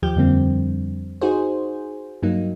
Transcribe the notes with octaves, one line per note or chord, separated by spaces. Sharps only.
D#2 F3 G4 G6
F2 D3 G3 A#3 C4
D#4 F#4 G#4 C5
G2 F#3 A#3 D#4